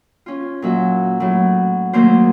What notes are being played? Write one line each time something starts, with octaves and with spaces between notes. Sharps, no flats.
C#4 F4
A#2 F#3 E5
A2 F#3
D#3 F#3 A3 A#3 A#4 C5